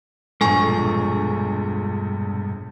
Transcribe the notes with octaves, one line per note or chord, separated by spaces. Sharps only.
E1 A#1 G2 F3 G#3 A4 G#5 C#6